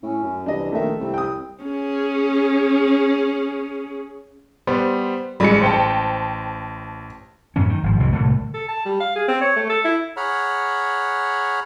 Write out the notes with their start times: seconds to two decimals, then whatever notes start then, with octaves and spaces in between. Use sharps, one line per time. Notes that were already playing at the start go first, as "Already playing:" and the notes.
0.03 A2 C#4
0.23 F#2
0.46 C2 E3 D4 D#5
0.72 A#1 D#3 A3 E5
0.99 C2 C4
1.14 G5 D#6
1.64 C#4 G#4
4.67 G3 B3 C5
5.40 A1 G3 G#3 B5 C#7
5.61 C5 G5 A5
7.56 F#2 A2 E3 C#4
7.70 D#3
7.83 G#1 F3
8.00 C2 F2 A2 E3
8.13 C2 A2 D3 A3
8.54 A4
8.68 A5
8.85 G3
9.00 F5
9.15 G#4
9.28 C4
9.41 C#5
9.56 A3
9.69 A4
9.84 E4
10.17 G#4 C#5 F#5 A#5 B5 F6